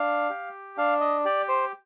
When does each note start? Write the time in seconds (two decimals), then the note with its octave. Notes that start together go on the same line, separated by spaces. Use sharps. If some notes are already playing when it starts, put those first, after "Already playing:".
Already playing: D4 F5
0.30 G4
0.77 D4 F5
1.01 D#5
1.25 G4 D5
1.48 C5